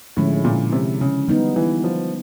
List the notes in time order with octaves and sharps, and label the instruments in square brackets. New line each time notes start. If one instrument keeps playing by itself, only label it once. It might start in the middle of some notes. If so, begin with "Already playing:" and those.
[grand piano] A2 [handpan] D3 F3 G#3 C#4 E4
[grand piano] A#2
C3
C#3
[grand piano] D#3 [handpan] G3 B3 D#4
[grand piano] E3
F3